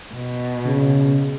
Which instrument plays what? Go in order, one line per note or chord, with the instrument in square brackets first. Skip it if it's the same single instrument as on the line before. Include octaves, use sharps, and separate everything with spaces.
[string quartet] B2
[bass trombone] C#3